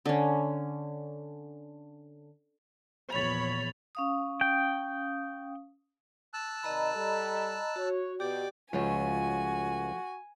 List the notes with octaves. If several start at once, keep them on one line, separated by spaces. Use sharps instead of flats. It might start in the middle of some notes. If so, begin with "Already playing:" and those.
D3 C#4
E2 A#2 F3 C#5 B5 A6 F7
C#4 F5 D#6
G5
A5 E6 F#6
C3 D#3 D5 D#5 A#5 B5
G3 A4
F#4 C#5
B2 G4 D5 G5 D6
C#2 F3 A3 F#4 C#5 G#5